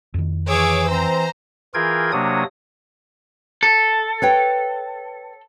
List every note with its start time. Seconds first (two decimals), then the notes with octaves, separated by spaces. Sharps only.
0.14 F2 D#3
0.49 E3 G#4 C#5 D6 E6
0.90 C4 C5 A#5
1.74 E3 F4 G#4 A#4 G5 G#6
2.13 C3 F#3 A#3 D4 C#5 D#6
3.63 A4
4.22 B4 C#5 G5